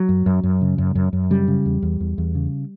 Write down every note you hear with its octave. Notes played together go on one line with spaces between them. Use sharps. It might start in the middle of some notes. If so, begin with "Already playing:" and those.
Already playing: F#3
F#2
F#2
F#2
C#3
F#2
F#2
F#2
C#3 G3
C#3
E2
E2
E2
E2
C#3